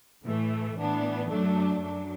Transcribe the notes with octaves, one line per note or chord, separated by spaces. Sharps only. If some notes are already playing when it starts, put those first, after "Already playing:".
A2 E3 A3
A2 E3 B3 D4
F#2 F#3 A3 D4
F#2 F#3 D4